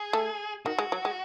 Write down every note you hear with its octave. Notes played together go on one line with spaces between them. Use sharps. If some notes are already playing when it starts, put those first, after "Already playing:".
Already playing: G#4
A3
D#3 F#4
G#3
F#3
G#3